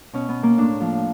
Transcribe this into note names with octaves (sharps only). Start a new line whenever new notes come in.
B2 C#4
B3
A#3
A2 D4
F3